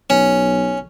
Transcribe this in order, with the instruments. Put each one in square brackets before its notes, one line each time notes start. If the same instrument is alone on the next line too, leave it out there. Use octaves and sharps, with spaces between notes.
[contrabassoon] B1 [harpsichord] C#4